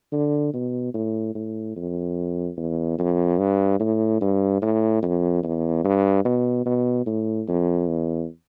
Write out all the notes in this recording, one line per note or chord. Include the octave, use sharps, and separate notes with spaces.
D3
B2
A2
A2
F2
E2
F2
G2
A2
G2
A2
F2
E2
G2
B2
B2
A2
F2
E2